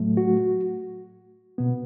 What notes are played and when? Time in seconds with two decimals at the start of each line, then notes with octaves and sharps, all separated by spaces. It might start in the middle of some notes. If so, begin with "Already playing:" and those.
Already playing: A2 F#3 A3
0.17 F#4
1.58 B2 B3